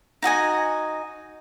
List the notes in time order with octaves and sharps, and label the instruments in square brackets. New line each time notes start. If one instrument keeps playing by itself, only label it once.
[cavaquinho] D#4 F#4 D#5 G#5